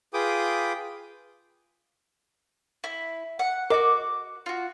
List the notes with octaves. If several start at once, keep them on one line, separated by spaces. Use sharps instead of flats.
F4 G#4 B4 G5 D6 D#6
E4
F#5
F#4 A#4 D#5 D6
F4 F#4